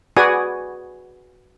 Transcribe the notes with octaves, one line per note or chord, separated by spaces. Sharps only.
F#4 G#4 B4 D5 G#5 D#6